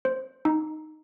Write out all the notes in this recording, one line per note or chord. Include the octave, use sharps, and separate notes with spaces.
C5
D#4